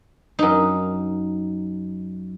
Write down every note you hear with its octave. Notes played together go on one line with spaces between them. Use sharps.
F#2 D#4